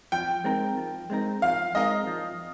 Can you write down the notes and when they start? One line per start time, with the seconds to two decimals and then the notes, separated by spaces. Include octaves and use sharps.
0.12 F3 G5
0.44 G#3 C4 D#4 A#4
0.77 F3
1.10 G#3 C4 D#4 A#4
1.42 F3 F5
1.75 G#3 C4 D#4 A#4 D#5
2.07 F3